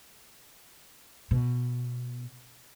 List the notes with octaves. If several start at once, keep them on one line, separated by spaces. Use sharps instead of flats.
B2